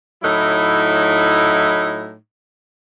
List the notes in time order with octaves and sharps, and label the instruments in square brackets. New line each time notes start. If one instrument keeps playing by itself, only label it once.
[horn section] A2 F#3 D#4 E4